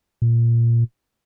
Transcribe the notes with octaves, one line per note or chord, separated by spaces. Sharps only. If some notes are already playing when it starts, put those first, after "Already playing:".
A#2